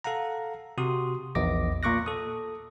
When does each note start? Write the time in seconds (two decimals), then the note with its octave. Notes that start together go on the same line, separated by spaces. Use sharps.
0.04 A4 F5 F#5 A#5
0.78 C3 F#4 C6 D#6
1.35 A#1 E2 D#5 D6 A#6
1.83 A#2 A#3 C#6 D6 F#6 A#6
2.06 A4 D#6